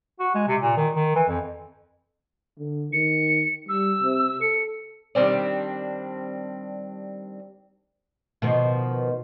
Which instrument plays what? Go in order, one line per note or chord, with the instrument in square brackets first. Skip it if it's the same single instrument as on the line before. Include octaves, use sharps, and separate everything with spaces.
[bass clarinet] F#4
G#3
C3
A#2
D#3
D#3
E3
F2
[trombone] D3
[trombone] D#3 [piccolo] C#7
[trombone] G3 [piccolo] E6
[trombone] C3
[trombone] A4 [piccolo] C#7
[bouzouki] D#3 G3 C4 D4
[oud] B2 D#3 F3